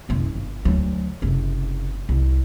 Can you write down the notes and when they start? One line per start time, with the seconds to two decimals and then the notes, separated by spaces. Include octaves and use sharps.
0.09 C2 F#2
0.35 G1
0.65 D2 F#3
1.22 F#1 C3
2.09 C2